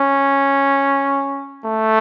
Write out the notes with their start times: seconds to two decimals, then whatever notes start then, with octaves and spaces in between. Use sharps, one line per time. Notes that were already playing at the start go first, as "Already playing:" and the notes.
Already playing: C#4
1.65 A3